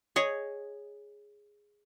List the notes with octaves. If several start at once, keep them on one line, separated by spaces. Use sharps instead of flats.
G#4 C#5 D#5